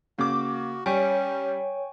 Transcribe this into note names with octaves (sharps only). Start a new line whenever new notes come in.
C#3 A#3 F#4 D6
G3 C#4 C#5 G5 G#5 C#6